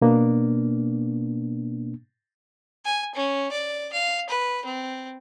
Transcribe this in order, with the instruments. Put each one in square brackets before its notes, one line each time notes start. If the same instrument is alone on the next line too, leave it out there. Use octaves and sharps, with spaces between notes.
[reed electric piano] B2 A#3 B3 D4
[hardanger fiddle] G#5
C#4
D5
F5
B4
C4